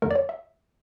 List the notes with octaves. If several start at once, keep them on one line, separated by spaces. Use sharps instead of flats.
F2 D3 A3 A#4
D5
C#5
E5